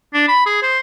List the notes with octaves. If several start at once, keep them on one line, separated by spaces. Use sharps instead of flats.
D4
B5
G#4
C5